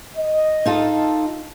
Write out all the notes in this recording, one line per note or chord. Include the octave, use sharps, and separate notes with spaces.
D#5
D#4 F4 A4